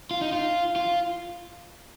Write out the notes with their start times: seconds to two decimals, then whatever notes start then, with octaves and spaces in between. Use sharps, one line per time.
0.11 F4
0.21 D#4
0.33 F4
0.76 F4